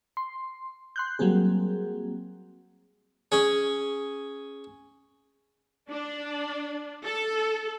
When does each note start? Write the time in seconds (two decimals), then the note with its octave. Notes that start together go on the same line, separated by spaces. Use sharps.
0.17 C6
0.96 C6 F#6 G6
1.19 F#3 G3 A#3 C4 G#4
3.32 C#4 G#4
5.90 D4
7.05 A4